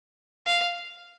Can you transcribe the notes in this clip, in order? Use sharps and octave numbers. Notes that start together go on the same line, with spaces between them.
F5